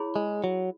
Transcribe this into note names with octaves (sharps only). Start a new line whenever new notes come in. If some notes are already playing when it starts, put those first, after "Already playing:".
Already playing: E4 G#4 C#5 B5
G#3
F#3